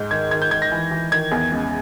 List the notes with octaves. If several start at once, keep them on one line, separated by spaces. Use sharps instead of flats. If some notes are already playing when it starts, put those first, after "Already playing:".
Already playing: G#2 G6
D#3 G#6
D#3 G#6
G6
D#3 G#6
A#6
E3
E3
D#3 G#6
E2
C#2